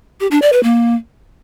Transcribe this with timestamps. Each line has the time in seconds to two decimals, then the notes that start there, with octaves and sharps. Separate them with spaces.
0.20 G4
0.31 D4
0.42 D5
0.53 B4
0.63 A#3